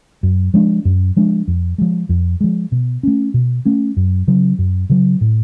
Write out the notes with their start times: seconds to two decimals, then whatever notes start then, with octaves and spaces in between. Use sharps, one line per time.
0.23 F#2
0.54 F3 G#3 D4
0.85 F#2
1.16 F3 G#3 D4
1.48 F2
1.78 F3 G#3
2.09 F2
2.41 F3 G#3
2.72 B2
3.03 A3 C#4
3.34 B2
3.65 A3 C#4
3.97 F#2
4.27 C#3 F#3
4.59 F#2
4.90 C#3 F#3
5.21 A2